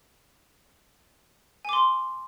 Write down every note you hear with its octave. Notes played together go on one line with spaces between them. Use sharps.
G#5 C6 D6